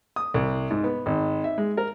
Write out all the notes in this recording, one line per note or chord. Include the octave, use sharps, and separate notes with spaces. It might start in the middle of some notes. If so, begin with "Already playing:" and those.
D#6
C2
G#2
B3
G#1
E5
G#3
A#4